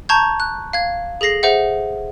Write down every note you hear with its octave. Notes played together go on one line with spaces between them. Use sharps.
A5 A#5 C#6 G6 G#6
F#6
F5 G#6
G#4 A4 A#6 C7
G#4 C5 E5 F#5